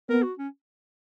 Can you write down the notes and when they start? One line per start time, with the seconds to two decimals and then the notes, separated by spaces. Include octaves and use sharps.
0.09 B3 A#4
0.23 F#4
0.38 C#4